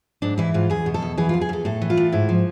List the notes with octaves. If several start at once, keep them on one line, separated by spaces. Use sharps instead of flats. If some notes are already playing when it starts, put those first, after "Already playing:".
G#2 D4
E3 E4
G#2 F4
E2 G#4
B2
A4
E2
E3 G#4
F4
E2
G#4
E2 A4
A2 A4
E3
F4
A2
G#2 E4
F3